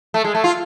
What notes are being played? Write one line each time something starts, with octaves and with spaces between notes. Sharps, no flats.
A3
G#3
A3
F4